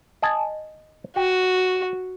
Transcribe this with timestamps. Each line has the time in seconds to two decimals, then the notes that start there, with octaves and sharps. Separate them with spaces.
0.22 D#5 G#5 A5
1.16 F#4 G5